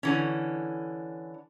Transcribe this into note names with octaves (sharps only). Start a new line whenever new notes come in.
D3 E3 C#4